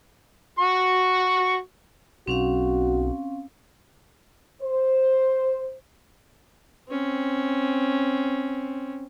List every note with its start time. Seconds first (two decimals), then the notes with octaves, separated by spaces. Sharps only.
0.59 F#4 C#6
2.28 B1 C4 C#4 F#4 F5
4.62 C5
6.89 C4 C#4